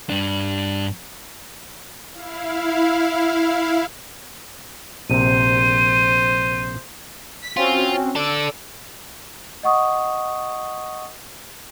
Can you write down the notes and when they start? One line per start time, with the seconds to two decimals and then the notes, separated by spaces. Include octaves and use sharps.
0.09 G2 D4
2.12 E4 F5
5.10 A#1 C3 C5 D#7
7.41 B6
7.57 C4 C#4 F4 F#4
8.15 A4 D5 E6 D7
9.63 D#5 F#5 C#6 D#6